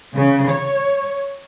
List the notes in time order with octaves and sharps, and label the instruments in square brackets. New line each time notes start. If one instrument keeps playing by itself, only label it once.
[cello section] C#3
C#5